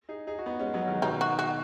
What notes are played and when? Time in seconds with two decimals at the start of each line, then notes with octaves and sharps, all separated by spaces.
0.09 D#4 G#4
0.27 D#4 G#4
0.39 F#4
0.46 B3 D#4
0.59 G#3 C#4
0.74 F#3 B3
0.88 D#3 G#3
1.02 B2 D#3 D#4
1.21 F#4
1.39 F#4